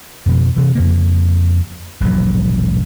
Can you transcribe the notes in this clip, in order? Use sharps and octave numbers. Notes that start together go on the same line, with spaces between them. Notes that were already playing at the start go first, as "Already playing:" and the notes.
F2 B2 F3
C3 E3
F2 C#3 A#3
E1 A#1 G#2 F#3